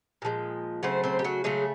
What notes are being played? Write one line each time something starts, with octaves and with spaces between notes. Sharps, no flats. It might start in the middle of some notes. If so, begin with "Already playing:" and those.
A#2 F3 G#3
C#3 F#3 A3 C4 C5
C4 C5
G4
F#3 F#4
C#3 F#3 G#3 A3 G#4